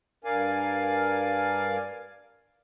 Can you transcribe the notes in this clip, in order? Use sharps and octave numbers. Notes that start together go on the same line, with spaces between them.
G2 A#4 D5 F5 G#5